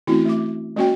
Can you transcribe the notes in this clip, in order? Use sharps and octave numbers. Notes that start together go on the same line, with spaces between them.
E3 A3 C4 C#4 E4 F#4
A3 E5 D6
G#3 A#3 C#4 F#4 C#5 G5